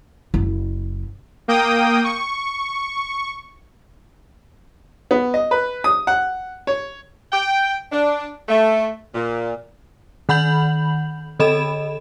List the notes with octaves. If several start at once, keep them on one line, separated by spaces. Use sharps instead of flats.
F#1 E4
A#3 G5 D#6
C#6
B3
D#5
B4
D#6
F#5
C#5
G5
D4
A3
A#2
D#3 F#5 B5 G6 F#7
D3 A4 D#5 B5 E7